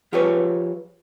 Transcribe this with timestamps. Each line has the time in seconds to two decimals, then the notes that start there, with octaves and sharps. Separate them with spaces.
0.12 F3 F4 G4 G#4 B4 C#5